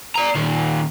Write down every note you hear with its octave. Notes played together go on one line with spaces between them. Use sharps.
D5 A#5
A#2 D#3